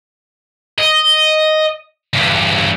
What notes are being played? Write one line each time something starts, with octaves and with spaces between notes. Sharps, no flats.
D#5
E2 G2